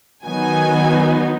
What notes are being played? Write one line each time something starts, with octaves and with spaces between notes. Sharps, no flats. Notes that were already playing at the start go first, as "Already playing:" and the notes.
D#3 F#3 B3 D#4 G#5